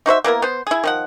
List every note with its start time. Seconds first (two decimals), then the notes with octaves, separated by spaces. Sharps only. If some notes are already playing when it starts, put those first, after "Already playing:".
0.06 D#4 F#4 C5 E5
0.24 A#3 B3 E4 A#4
0.42 B3 C5
0.67 E4 G#4
0.84 D#3 F3 F#5